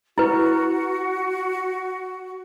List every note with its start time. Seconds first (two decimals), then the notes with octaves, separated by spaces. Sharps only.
0.18 E4 F#4 B4